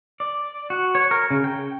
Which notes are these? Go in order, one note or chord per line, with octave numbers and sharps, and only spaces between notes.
D5
F#4
C#5
A#4
C#3
G5